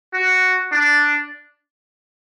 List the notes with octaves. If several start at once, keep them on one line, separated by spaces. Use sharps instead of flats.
F#4
D4